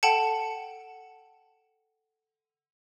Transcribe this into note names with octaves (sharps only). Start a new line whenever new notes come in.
A4 F#5 G5 A5 C#7